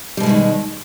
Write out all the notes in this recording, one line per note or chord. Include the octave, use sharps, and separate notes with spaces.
B2 D#3 E3 G3 G#3